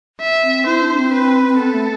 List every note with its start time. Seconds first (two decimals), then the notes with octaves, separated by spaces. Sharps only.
0.21 E5
0.43 C4
0.66 E4 C5
0.82 D4
0.97 C4
1.13 B4
1.49 C4
1.59 B3 A4
1.74 A3